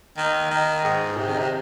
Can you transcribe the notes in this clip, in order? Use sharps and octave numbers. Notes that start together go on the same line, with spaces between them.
D#3
D#3
G#2
C3
D#3
C3